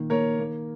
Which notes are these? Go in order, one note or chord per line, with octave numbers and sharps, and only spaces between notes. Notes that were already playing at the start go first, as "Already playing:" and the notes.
Already playing: A#2 D#3
A#3 A#4 C#5
A#3